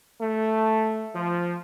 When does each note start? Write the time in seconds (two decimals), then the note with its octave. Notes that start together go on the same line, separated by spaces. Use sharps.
0.22 A3
1.15 F3